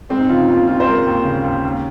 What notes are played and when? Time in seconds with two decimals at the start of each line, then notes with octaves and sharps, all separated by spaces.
0.09 G#3 C4
0.19 D#4
0.29 C#3 F4
0.38 D#4
0.48 D#2 F4
0.67 D#2 F4
0.80 C5
0.86 G#3 A#4
1.06 D#2
1.25 C#3
1.44 D#2
1.64 D#2